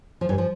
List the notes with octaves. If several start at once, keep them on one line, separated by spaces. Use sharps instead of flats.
F3
G2 E3 G3
F3